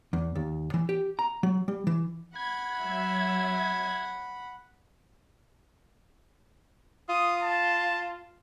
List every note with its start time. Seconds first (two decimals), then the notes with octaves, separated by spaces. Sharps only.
0.13 E2
0.35 D#2
0.74 E3
0.89 G4
1.19 A#5
1.43 F#3
1.68 G3
1.87 E3
2.36 F#5 B5 G#6
2.78 F#3 E5
7.09 F4 D#6
7.43 A5